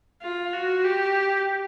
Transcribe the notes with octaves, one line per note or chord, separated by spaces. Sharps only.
F4
F#4
G4